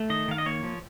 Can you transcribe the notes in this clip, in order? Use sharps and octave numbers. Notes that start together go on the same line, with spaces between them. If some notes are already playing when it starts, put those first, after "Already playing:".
Already playing: A3
D#3 D#5
D#3 F5
D#5
A#3 C#5
F3